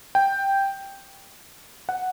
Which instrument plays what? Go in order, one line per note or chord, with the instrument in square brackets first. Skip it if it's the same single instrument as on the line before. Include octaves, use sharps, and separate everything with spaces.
[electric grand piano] G5
F#5